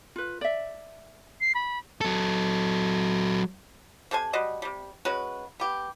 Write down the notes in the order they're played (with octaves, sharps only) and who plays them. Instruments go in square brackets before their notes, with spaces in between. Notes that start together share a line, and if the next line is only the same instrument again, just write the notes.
[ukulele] F4 B4
D5 E5
[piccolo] C7
B5
[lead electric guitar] F#3 A4
[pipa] C3 A4 C5 G#5
G3 F#4 C5 D#5
C3 G3
G#3 C#4 F#4 B4
B3 G4